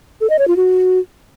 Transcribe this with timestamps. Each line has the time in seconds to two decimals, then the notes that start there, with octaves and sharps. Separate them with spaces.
0.21 A4
0.30 D#5
0.39 C#5
0.47 F4
0.56 F#4